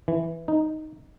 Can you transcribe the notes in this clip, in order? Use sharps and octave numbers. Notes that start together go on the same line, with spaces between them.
E3
D#4